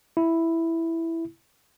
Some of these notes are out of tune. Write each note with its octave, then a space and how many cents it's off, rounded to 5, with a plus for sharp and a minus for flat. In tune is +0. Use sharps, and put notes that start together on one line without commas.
E4 +0